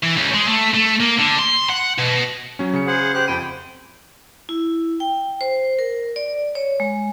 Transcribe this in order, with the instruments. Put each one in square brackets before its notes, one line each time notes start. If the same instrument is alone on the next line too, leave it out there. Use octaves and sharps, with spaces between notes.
[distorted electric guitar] E3
C#2
G#3
A3
A3
A#3
D3
C6
F#5
B2
[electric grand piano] F#3 C#4
C#3 C#7
[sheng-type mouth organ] G#4 C5 F#5
G4 C5 F#6
[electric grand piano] F2 B5 D#7 [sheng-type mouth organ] G5
[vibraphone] E4
G5
C5
A#4
D5
C#5
G#3